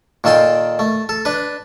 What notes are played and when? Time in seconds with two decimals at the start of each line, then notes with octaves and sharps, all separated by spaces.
0.24 A#2 D#3 A4 G5 C6
0.79 A3
1.09 A4
1.25 D4 B4